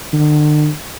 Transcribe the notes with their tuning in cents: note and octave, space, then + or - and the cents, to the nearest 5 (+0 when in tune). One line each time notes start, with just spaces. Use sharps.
D3 +40